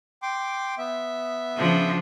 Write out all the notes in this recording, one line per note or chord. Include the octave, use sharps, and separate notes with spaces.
G5 C6 D6
B3 E5
C#3 F3 D4